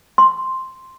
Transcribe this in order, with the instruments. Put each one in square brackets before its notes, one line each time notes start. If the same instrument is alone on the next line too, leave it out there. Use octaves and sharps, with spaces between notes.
[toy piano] C6